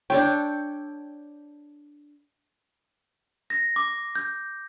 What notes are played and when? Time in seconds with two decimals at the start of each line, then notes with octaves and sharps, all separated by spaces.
0.10 D4 A4 C#5 G5
3.50 A#6
3.76 D6
4.16 G6